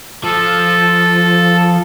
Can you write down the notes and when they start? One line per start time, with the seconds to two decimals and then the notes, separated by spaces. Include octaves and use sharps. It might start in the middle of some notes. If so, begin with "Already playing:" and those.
0.24 F3 A4